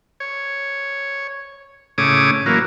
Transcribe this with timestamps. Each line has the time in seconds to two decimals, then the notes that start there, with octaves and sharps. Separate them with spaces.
0.20 C#5
1.98 A2 C#3 C#5 D6 D#6
2.46 E3 F#3 A#3